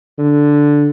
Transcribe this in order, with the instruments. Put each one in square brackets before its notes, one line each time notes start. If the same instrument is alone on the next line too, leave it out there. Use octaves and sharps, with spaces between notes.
[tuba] D3